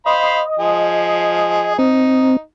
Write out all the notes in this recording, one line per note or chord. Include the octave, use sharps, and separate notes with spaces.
C5 D#5 F5 B5
F3 G#4
C4 D#4